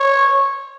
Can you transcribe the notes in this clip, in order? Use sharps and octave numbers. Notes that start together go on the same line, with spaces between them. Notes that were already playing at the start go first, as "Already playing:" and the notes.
Already playing: C#5